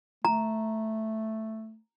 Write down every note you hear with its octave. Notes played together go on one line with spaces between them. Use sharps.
A3 A#5